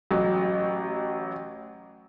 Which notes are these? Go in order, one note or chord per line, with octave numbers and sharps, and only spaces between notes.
A1 F#3